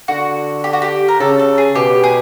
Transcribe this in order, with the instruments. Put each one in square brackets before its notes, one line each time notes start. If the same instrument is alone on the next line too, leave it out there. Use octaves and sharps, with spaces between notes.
[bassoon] D3 [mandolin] F#4
[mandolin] G4
F#4
G4
A#4
[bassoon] C#3 [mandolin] A4
[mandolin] A4
G#4
[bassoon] B2 [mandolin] G4
[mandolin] G#4